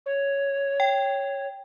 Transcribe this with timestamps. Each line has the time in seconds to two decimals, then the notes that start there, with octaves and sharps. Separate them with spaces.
0.05 C#5
0.80 G5